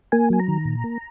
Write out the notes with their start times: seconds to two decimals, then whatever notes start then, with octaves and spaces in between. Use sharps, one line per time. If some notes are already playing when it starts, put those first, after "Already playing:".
0.12 A#3 G#5
0.30 F#3 G#5
0.40 A#5
0.48 D#3
0.65 A#2
0.84 A#3